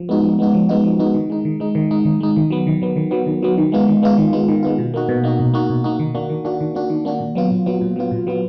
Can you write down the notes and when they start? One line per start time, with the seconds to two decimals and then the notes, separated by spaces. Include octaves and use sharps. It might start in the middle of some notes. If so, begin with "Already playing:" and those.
Already playing: F3
0.09 G#3 B3 D#4 F#4
0.24 F3
0.39 G#3 B3 D#4 F#4
0.54 F3
0.69 G#3 B3 D#4 F#4
0.85 F3
0.99 G#3 B3 D#4 F#4
1.14 D#3
1.30 G#3 D#4
1.45 D#3
1.60 G#3 D#4
1.75 D#3
1.91 G#3 D#4
2.05 D#3
2.20 G#3 D#4
2.36 D#3
2.50 F#3 B3
2.67 D#3
2.82 F#3 B3
2.96 D#3
3.11 F#3 B3
3.26 D#3
3.43 F#3 B3
3.58 D#3
3.72 G#3 B3 F4
3.88 D#3
4.03 G#3 B3 F4
4.18 D#3
4.33 G#3 B3 F4
4.49 D#3
4.63 G#3 B3 F4
4.78 B2
4.94 A#3 D#4 F#4
5.09 B2
5.24 A#3 D#4 F#4
5.39 B2
5.54 A#3 D#4 F#4
5.69 B2
5.84 A#3 D#4 F#4
5.99 D#3
6.14 A#3 D4 F#4
6.30 D#3
6.45 A#3 D4 F#4
6.61 D#3
6.75 A#3 D4 F#4
6.90 D#3
7.05 A#3 D4 F#4
7.20 A#2
7.35 F#3 B3 F4
7.51 A#2
7.66 F#3 B3 F4
7.81 A#2
7.96 F#3 B3 F4
8.11 A#2
8.27 F#3 B3 F4